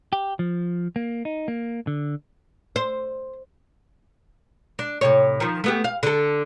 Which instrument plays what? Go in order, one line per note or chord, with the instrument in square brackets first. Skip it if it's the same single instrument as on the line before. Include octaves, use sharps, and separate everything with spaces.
[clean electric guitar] G4
F3
A#3
D#4
A#3
D3
[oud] C5
D4
A2 C3 C#5
D#3 F3
A3 B3 G4
F5
D3 A4